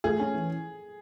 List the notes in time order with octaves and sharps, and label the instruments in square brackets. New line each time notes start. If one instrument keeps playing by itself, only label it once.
[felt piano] A3 [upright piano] G#4
[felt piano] C#4
E3